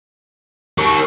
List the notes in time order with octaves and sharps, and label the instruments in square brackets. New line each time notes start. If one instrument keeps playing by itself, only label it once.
[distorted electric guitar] G4 A#4 [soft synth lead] C#6